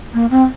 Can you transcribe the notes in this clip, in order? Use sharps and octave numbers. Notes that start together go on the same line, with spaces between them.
A#3
C4